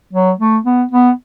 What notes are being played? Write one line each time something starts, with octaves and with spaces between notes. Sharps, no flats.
F#3
A3
B3
B3